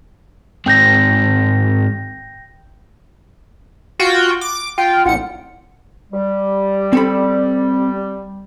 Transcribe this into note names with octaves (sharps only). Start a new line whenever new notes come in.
G#2 G#3 C4 G5 G6 A#6
F4 F#4 G5
D6 D7
F4 G5
A1 F#5 C#7
G3
C4 A4 B5